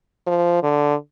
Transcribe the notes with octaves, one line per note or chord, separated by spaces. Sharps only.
F3
D3